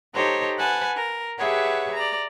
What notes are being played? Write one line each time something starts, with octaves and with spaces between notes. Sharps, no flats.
D#4 G4 A4 C5 C#5 A#5
B4 F#5 G#5 A5
A#4
G4 G#4 B4 C#5 E5 F#5
D5 A#5